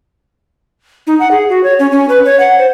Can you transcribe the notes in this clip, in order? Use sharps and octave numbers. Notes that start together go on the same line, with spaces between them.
D#4
F#5
G#4
F#4
C#5
C#4
C#4
B4
C#5
F#5
C5